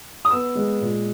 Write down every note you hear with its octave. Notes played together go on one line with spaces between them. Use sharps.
D#6
B3 E6
G#3
A#2